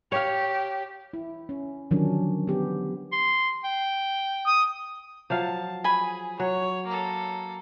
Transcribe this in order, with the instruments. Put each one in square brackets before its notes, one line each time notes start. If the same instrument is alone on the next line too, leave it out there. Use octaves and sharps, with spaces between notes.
[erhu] G4 [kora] C#5 F5
[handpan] E4
C#4
D3 D#3 F3 F#3 C#4 D4
B3 G4
[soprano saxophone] C6
G5
[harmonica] D#6
[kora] F3 F#3 F5 [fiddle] A5
[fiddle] G#4 [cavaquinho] G#5 B5
[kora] F#3 [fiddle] C#5
[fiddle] A#3 A4